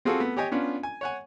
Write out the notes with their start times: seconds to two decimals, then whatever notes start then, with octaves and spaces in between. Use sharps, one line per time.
0.05 C4 F4 F#4 G#4 A4
0.19 A3 B3
0.37 G4 C#5 D#5 G5 G#5
0.52 B3 C#4 D4 F4
0.83 G#5
1.01 C#5 F#5 G#5